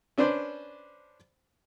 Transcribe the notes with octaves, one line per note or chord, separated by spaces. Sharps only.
C#4 D4 B4 C5 D5